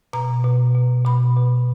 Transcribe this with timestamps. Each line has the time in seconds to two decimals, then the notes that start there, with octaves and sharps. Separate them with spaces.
0.13 B2 A#5
0.44 B2
0.75 B2
1.05 B2 B5
1.37 B2